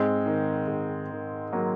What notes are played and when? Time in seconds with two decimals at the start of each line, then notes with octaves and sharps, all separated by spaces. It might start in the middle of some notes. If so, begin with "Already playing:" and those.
Already playing: G#2 G#3 C4
0.26 D#3
0.68 G#2
1.10 D#3
1.52 F#3 A#3